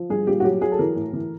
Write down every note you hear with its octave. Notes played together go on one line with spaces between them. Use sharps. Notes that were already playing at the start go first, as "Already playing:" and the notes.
Already playing: F3
G2 G#4
A#2 G4
F#4
F#3 G4
F#3 G#4
A4
E3 A#4
A2
E3